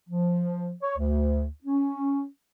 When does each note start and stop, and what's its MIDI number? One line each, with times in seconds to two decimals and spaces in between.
0.07 0.72 53
0.82 0.95 73
0.96 1.45 38
1.64 2.24 61